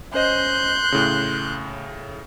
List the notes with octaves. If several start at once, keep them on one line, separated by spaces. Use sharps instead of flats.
C#4 C5 D#5 C6 F#6 G6
A2 C#3